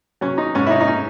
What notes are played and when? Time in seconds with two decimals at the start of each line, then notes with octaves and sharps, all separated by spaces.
0.21 F#3 C#4
0.38 D#4
0.55 G#2 C#4
0.67 E4
0.71 D#4
0.81 D#4
0.87 C#4